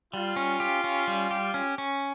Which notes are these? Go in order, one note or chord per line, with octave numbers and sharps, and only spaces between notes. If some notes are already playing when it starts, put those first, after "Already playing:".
G3 F4
C#4
G4
C#4
G3
G4
C#4
C#4